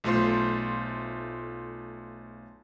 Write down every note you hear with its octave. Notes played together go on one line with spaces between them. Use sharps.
B1 A3 F4 C5 C6